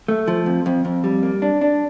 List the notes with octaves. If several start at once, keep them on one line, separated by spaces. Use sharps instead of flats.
A3
F3
F2
F2
F2
G3
A#3
D4
D4